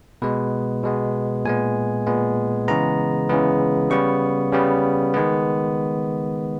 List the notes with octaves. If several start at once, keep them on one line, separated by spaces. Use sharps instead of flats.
B2 G#3 B3 B4
B2 G#3 B3
A#2 G#3 B3 G#5
A#2 G#3 B3
C#3 E3 G#3 B3 A#5
C#3 E3 G#3 B3
C#3 G3 B3 C#6
C#3 G3 B3
D#3 G#3 B3